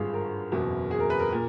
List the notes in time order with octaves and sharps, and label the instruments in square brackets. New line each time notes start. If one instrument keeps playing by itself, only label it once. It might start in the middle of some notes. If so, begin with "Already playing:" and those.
Already playing: [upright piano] G#1 G2 D3 F4 G#4
A#4
F#1 E2 B2
G#4
A#4
B4
A#4
A#2